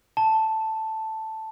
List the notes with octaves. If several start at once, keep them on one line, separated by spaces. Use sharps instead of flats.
A5